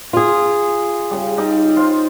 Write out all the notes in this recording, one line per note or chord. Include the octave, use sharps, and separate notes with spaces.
F4 G#4
C#3 G3
G3 D#4
F4 C5